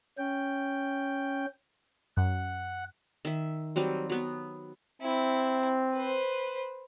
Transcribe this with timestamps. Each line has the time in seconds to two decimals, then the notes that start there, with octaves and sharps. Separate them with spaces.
0.18 C#4 G5
2.17 F#2 F#5
3.25 D#3 E5
3.76 F#3 G3 C4
4.10 F#3 B3
5.02 C4 E4
5.94 B4 C5